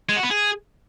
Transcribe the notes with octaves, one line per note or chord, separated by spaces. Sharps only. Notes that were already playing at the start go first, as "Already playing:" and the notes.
G#3
F#4
B3
G#4